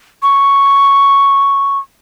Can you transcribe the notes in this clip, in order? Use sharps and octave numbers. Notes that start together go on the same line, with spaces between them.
C#6